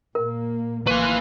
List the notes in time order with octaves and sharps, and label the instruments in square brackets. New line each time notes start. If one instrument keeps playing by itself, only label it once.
[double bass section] A#2 A#3 [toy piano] A#4
[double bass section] A1 A#3 [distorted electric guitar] B4 G#5 [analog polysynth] F5 C6 F#6 [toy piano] C#6